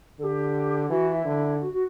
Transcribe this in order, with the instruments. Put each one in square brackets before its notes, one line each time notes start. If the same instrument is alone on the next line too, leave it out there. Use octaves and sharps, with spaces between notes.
[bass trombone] D3 [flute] A4
[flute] G4
[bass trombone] E3 [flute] F#4
[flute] F#4
E4
[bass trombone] D3
[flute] F#4
F#4